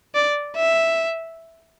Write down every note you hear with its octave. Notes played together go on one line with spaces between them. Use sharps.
D5
E5